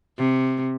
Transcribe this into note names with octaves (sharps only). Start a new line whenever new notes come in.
C3